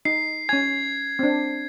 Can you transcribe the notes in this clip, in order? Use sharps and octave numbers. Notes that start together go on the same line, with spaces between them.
D#4 C7
C#4 G#5 G#6
C4 D4